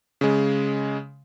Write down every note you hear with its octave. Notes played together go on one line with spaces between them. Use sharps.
C#3 G#3